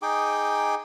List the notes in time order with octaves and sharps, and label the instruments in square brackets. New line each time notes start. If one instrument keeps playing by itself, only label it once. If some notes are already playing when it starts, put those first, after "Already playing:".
[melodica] D#4 G#4 G5 D6